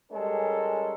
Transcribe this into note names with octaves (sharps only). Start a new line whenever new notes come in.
G3 G#3 C#4 A4 A#4